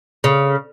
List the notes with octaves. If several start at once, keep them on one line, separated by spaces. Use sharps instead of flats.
C#3